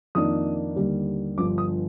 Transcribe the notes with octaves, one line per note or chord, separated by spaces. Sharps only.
F2 D#3 A#3 D4 D#6
D#2 D3 G3
G1 G2 F3 D6
D#6